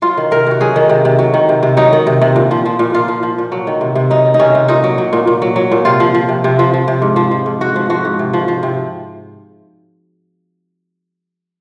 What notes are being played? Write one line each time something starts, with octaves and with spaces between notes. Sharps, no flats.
F#3 F4
D#3
C3 A#4
C3 F#4
F#3 G#4
D#3
C3
C3
F#3
D#3
C3
C3
F#3 D#4
D#3
C3
C3
A#2
F3
F3
A#2
A#2 F4
F3
F3
A#2
F#3
D#3
C3
C3
F#3 D#4
D#3
D#4
C3 C#4
C3
A#2 D#4
F#3
F#3
A#2
A#2
F#3
F#3
A#2
C3 F4
F3
F3
C3
C3
F3
F3
C3
G#2
F3
F3
G#2
G#2 F#4
F3
F3 F#4
G#2
C3
F3
F3
C3